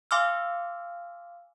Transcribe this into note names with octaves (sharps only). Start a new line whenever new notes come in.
F5 G#5 C6 D6 E6 F6